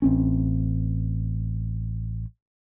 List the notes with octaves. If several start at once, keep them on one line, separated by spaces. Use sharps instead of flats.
A1 C4 C#4